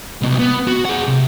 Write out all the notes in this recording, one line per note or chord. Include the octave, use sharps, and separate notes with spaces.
C2 B2
B3
F#4
G#4 F#5
C3